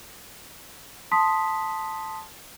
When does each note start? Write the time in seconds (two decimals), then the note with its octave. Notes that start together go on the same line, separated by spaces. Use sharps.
1.11 A5 C6 D#6 B6